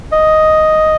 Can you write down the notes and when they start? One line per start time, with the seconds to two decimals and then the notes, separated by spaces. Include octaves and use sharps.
0.12 D#5